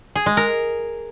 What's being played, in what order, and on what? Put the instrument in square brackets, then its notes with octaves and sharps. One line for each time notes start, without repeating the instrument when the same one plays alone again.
[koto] G#4
G#3
A#4